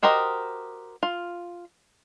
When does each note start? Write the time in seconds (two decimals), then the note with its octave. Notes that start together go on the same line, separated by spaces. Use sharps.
0.03 F#4 G4 A#4 C5 D#5
1.03 F4